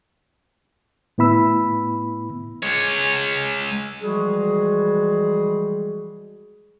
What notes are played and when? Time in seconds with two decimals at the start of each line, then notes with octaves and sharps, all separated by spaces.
1.18 A2 B3 E4 B5 E6
2.63 G#3 C#5
4.01 E3 F3 G3 G#3 F#4 G#4